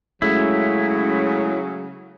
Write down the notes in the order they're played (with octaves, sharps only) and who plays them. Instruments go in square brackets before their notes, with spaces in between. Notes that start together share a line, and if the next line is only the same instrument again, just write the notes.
[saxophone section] C#3 F#3 [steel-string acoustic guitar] G#3 A3 C#4 [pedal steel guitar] E4